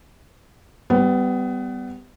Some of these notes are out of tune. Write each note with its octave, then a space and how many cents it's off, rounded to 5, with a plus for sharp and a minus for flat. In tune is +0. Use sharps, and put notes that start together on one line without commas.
G3 +0 B3 +25